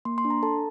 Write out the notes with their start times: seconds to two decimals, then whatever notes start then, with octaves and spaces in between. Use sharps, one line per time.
0.05 A#3 C6
0.18 C6
0.25 D4
0.30 A#5
0.43 A4 A5